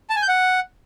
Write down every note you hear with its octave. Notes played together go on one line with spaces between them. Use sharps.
A5
G#5
G6
F#5